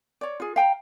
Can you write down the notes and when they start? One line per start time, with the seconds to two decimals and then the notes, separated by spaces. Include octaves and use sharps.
0.21 C#5 D5
0.40 F4 G#4
0.56 F5 G5 G#5 A#5